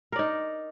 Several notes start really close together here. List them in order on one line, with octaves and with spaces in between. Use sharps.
A#4 D5 D#4